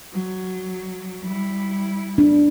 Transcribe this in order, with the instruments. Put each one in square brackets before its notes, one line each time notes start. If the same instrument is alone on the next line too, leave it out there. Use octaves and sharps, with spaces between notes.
[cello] F#3
G3 E4
[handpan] D4